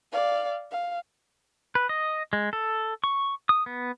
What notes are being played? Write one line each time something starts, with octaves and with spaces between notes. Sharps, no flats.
D5 F5
F5
B4
D#5
G#3
A4
C#6
D#6
B3